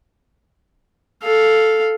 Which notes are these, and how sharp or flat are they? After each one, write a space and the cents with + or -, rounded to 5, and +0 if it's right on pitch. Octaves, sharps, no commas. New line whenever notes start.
A4 +0 F5 +0